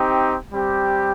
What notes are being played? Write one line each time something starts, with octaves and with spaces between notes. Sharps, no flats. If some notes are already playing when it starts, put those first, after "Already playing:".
Already playing: C4 D#4 G4
G3 C4 G4